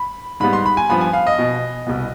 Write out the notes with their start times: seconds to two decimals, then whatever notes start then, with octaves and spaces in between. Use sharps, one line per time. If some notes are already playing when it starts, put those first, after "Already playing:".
Already playing: B5
0.40 G#2 G3 B3 B5
0.53 C6
0.66 B5
0.77 G#5
0.90 G2 F3 B3 B5
1.01 G#5
1.13 F5
1.27 D#5
1.38 B2 B3
1.87 C2 B2 B3